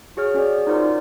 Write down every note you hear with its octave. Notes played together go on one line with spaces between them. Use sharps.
F#4 G#4 C#5 F6
C#4 F#4 G#4 D5
D#4 F4 F#4 A#4 C5 D5